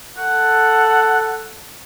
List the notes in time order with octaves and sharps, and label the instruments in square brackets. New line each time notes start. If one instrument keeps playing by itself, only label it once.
[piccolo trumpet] A4 [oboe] F#5